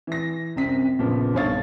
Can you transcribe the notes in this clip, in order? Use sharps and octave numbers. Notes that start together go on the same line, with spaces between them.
E3 A#6
C2 F#2 C4 B6
A#1 A#2 C#3 F3 B3
B1 G2 D3 C#5 F5 A6